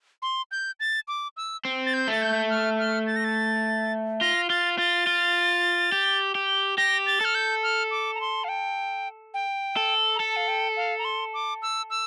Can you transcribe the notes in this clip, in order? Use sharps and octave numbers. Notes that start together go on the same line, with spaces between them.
C6
G6
A6
D6
E6
C4
A6
G6
A3 A6
G6
F6
F6
A6
A#6
A6
F4 A#6
F4 A6
F4 A6
F4
G4
G4
G4 A#6
A6
A4 F6
G6
F6
D6
A#5
C6
F5
G5
G5
A4
A#5
A4 A5
F5
G5
F5
A#5
C6
D6
E6
E6